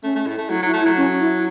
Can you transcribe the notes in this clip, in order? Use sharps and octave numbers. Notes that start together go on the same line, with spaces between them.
A3 C#4
A3
A2
A3
F#3 E4
F#3
E4
A3
E4
F#3
C#4
E4